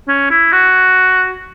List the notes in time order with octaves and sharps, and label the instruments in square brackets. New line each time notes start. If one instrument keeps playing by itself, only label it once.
[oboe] C#4
E4
F#4